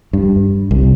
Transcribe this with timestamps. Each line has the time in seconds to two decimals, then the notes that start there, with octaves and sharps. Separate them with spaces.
0.13 G2
0.71 C2